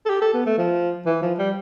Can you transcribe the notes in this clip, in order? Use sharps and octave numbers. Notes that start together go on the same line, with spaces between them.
A4
G4
A4
B3
A3
F3
E3
F3
G3